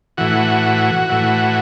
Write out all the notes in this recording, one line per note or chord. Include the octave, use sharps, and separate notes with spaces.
A2 E3 F#4
A2 E3